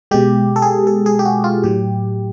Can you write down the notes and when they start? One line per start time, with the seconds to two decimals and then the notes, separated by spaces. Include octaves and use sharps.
0.11 B2 G#3 G4
0.56 A4
0.62 G#4
0.87 A4
1.06 G#4
1.19 G4
1.25 F#4
1.44 F4
1.64 A2 F#3 G4